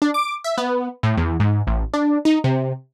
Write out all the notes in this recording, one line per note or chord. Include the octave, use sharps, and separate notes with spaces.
D4
D6
E5
B3
A2
E2
G#2
A1
D4
D#4
C3